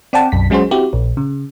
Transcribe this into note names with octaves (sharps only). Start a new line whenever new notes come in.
C4 D5 F#5 G5 A5
B1 F#2 B6
F#3 G#3 C#4 F#4 G#4 C5
C4 E4 F#4 G4
A#1
C#3